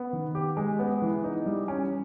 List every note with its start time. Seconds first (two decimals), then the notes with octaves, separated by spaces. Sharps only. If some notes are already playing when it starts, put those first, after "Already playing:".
Already playing: B3
0.13 D#3
0.35 G4
0.57 G#3
0.79 B3
1.02 E3
1.24 D#4
1.46 G3
1.68 C#4